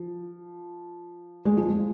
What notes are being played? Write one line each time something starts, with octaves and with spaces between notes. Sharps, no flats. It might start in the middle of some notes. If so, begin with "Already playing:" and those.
Already playing: F3
G#3
F3
G#3